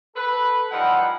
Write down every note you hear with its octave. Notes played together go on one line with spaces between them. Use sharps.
A4 B4
F3 G3 D#4 E4 B4 F#5